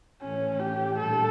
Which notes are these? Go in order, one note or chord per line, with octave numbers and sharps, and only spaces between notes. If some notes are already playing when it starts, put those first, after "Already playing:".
A2 E3 A3 C#4
G4
A#2 G3 A#3 D4 A4